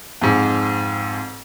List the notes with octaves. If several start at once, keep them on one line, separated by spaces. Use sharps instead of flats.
F2 G#2